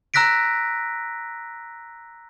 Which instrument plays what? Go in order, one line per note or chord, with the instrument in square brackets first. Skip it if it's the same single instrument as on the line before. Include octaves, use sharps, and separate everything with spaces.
[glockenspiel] A#5 E6 F#6 A#6 B6 D7